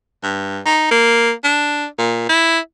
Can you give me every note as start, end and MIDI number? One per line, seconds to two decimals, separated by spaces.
0.23 0.59 43
0.66 0.89 63
0.91 1.32 58
1.44 1.86 62
1.98 2.25 46
2.29 2.59 64